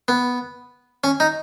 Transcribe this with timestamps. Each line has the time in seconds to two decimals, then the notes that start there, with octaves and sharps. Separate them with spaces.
0.08 B3
1.04 C#4
1.20 D#4